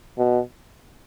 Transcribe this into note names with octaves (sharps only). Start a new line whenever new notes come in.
B2